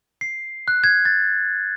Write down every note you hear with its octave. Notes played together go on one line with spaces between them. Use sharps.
C7
F#6
G#6
A6